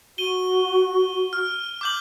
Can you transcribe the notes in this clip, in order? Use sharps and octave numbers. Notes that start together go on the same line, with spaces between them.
F#4 D#7 G7
F6
D6 G6 F#7